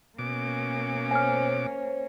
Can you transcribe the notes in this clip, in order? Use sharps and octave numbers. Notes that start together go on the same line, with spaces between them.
B2 A#3 C#4 D6
C5 C#5 G#5 F6